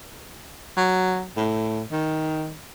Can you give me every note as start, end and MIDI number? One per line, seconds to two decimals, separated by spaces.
0.77 1.26 54
1.37 1.82 45
1.92 2.54 51